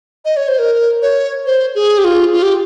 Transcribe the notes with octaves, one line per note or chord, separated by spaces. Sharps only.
D#5
C#5
C5
A#4
C#5
C5
G#4
G4
F4
F4
G4